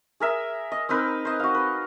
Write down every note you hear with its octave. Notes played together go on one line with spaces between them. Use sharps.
G#4 A#4 E5
D#5
C4 D#4 A#4 B4
C5 D#5
F#4 F5
B4